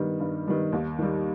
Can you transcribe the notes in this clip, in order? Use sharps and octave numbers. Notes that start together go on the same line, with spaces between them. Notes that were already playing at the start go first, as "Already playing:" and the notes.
Already playing: G2 D#3 G3 B3
G2
D#3 G3 B3
D#2
D#3 G3